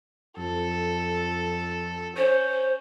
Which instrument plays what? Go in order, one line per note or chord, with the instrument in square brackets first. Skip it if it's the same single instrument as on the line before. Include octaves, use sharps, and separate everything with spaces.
[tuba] F2 [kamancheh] A4
[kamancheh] C#4 [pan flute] C5